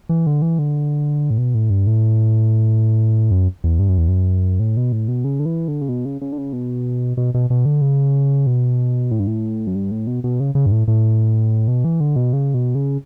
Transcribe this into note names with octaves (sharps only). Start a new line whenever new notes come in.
E3
D3
E3
D3
A2
B2
A2
G2
A2
F#2
E2
G2
F#2
E2
F#2
A2
B2
A2
B2
C#3
D3
E3
D3
C#3
B2
C#3
C#3
D3
C#3
B2
B2
B2
B2
D3
C#3
B2
A2
G2
A2
F#2
G2
A2
B2
B2
C#3
C#3
G2
A2
A2
B2
E3
D3
B2
C#3
B2
C#3